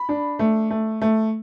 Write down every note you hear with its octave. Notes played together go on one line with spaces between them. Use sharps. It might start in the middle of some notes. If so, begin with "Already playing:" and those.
Already playing: B5
D4
A3
A3
A3